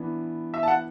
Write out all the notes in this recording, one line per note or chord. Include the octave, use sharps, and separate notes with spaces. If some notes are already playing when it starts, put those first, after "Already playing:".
Already playing: E3 B3 D4
E5
A5
F#5